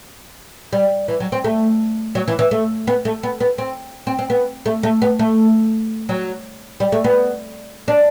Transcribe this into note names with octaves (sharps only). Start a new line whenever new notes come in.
G3
E3
F#3
C4
A3
F#3
E3
E3
A3
B3
A3
B3
B3
C4
C4
C4
B3
A3
A3
B3
A3
F#3
G3
A3
B3
D4